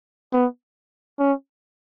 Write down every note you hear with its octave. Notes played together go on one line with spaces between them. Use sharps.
B3
C#4